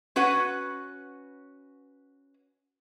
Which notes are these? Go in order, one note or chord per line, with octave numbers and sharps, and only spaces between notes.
C#4 F#4 B4 F#5